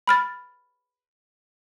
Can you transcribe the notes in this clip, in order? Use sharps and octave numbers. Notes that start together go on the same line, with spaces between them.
B5 F6 A6